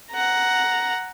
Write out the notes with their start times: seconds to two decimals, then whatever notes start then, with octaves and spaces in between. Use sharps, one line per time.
0.12 F#5 A#5